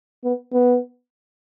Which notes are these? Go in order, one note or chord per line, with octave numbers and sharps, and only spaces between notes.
B3
B3